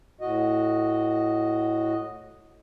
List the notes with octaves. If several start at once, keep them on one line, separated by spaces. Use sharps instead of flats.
A2 F#4 D#5